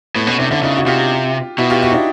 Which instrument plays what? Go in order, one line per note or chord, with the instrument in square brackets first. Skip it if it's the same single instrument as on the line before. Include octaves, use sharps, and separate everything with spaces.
[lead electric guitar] A2 [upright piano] A3 B3
[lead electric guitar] B2 [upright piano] B3 C#4
[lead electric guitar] C3 [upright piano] D4 E4
[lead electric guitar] D3 [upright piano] D4 E4
[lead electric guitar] C#3 [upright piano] D#4 F4
[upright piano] F#4
[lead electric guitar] C3 [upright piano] F4 G4
[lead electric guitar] B2 [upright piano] E4 F#4
[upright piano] F4 G4
E4 F#4
D#4
D4 E4